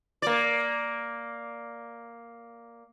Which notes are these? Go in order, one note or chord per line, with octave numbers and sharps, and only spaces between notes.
A#3 D5